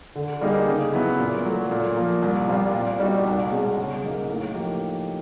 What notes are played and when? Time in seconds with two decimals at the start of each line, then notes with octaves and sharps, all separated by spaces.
0.15 D3
0.41 G3 A#3 D#4 G#4
0.68 C#3
0.93 F#3 B3 E4
1.19 A#2
1.45 F#3 A3
1.71 A#2
1.97 F3 A#3
2.22 C2
2.48 A#2 G3 C4 F4
2.74 A#2
3.00 G3 C4 D#4 F#4
3.26 C2
3.52 B2 G#3 C#4
3.77 C#3
4.03 F#3 A#3 D#4
4.29 A2
4.54 F3 A#3 D#4 G4